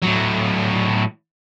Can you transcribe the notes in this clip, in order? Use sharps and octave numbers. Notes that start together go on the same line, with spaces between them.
A2 F#3